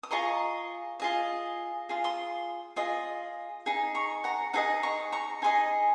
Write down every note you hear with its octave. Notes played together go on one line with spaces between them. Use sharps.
D#6
F4 G#4 D#5 A#5 C#6
F4 G#4 D#5
F4 G#4
C6 D#6
F4 G#4 D#5
D#4 G#4
A#5 C#6
F#5 A#5
D#4 G#4 D#5 F#5 A#5
A#5 C#6
A#5 C#6
D#4 G#4 D#5 G#5 C6